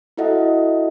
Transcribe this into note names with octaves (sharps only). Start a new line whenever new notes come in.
E4 F#4 A4 D#5 E5 F#5